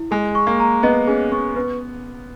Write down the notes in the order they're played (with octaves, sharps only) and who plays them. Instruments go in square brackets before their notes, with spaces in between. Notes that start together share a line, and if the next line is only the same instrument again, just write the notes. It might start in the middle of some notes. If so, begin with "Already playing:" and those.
Already playing: [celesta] E4
[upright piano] G#3 [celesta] G#4
[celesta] C#6
[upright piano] A#3
[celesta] A#5
[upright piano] B3 [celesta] D#5
[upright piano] C#4 [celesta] G#4
[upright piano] B3 [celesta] C#6
[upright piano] B3 [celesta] B4